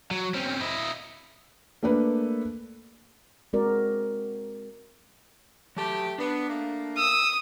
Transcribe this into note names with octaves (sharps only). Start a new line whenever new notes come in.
F#3
C4 C#4
E4 D#5
A3 A#3 D4 A4 B4
G#3 C4 F#4 A#4 D5
F#3 A3 G4 A5
B3 D4
A3 A#3
D#6 E6